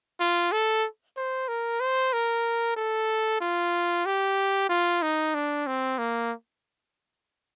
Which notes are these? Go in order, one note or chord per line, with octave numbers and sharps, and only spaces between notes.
F4
A4
C5
A#4
C5
A#4
A4
F4
G4
F4
D#4
D4
C4
A#3